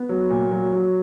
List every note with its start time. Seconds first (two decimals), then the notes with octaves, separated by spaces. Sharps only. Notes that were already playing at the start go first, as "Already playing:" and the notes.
Already playing: B3
0.09 F#3
0.30 A#2
0.51 F#3
0.73 F#3